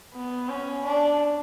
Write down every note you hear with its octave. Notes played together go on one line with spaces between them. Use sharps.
B3
C#4
D4